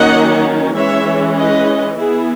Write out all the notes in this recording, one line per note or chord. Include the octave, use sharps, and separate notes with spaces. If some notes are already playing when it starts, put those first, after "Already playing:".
Already playing: D#3 F#3 A#3 C#4 D#5 F#5
E3 G#3 C#4 C#5 E5
B4 D#5
E3 B3 E4 G#4